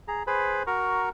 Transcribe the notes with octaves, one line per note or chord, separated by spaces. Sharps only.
G#4 A#5
G#4 B4 C5 B5
F#4 A#4 A#5 C#6